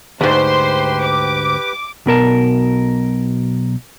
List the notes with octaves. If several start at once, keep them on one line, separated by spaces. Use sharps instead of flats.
D2 G#2 G4 B4 C5 G5 C6
D6
B1 B2 A#4 A5